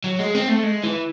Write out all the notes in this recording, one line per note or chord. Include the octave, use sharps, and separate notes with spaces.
F#3
G#3
C4
A3
G#3
E3